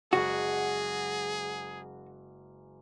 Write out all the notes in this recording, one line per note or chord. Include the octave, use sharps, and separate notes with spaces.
F#1 G#3 F#4 G#4 F#6